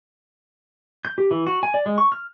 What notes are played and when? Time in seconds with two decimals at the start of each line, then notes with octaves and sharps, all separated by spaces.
1.05 G6
1.18 G4
1.31 E3
1.47 F#4
1.63 G#5
1.74 D5
1.86 G#3
1.98 C#6
2.12 F6